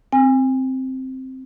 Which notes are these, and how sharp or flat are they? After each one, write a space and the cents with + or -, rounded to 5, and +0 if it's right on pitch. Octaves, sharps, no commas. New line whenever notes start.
C4 +0 G#5 -30